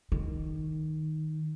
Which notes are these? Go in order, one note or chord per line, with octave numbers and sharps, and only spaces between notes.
D#3